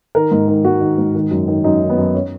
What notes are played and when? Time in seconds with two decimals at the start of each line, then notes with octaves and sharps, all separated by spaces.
0.15 D#3 A#4
0.31 G#2
0.48 D#3
0.64 G#2 F#4
0.81 D#3
0.98 G#2
1.15 D#3
1.31 F#2
1.48 D#3
1.64 F#2 D#4
1.81 D#3
1.90 B3
1.98 F#2
2.14 C#4